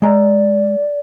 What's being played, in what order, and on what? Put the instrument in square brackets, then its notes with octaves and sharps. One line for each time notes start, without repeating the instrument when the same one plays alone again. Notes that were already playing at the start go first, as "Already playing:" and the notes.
[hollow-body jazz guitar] G#3 A#5 [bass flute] D5